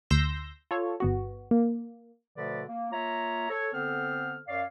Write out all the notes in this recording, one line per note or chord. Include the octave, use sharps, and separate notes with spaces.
D2 C6 E6 G6 A#6
F4 A4 C#5
G1 B3 F#4
A#3
B2 D3 F3 A3 B4 D5
A#3
A#3 F4 C#5 E5 A#5
A4 C#5
D3 B3 C4 A4 C5 F6
F#2 C#5 D5 F5